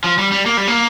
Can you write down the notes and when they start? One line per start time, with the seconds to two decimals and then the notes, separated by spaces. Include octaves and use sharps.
0.04 F3
0.18 G3
0.32 G3
0.46 A#3
0.57 G3
0.67 A#3